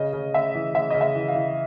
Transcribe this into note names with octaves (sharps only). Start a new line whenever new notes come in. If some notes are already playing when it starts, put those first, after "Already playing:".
Already playing: C#3 D#5
C#3
C#3 E5
E3
C#3 E5
C#3 D#5
E5
E3
F5
E3